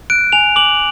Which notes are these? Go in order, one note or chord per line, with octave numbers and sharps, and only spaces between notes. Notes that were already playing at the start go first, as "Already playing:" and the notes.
F#6 D7
G#5 F7
D6 F#7